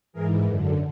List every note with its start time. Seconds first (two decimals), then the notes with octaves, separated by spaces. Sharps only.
0.13 G#2 E3 G#4 A#4
0.44 F#2 D3